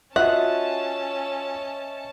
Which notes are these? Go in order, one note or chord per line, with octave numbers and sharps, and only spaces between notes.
C#4 F4 F#4 D#5 E5 F#5 A5